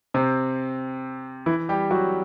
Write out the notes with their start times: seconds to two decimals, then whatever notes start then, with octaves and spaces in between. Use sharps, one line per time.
0.14 C3 C4
1.46 E3 E4
1.69 G3 G4
1.91 F#3 F#4